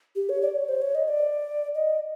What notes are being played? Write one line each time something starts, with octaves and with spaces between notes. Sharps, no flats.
G4
C#5
D5
C#5
C5
C#5
D#5
D5
D#5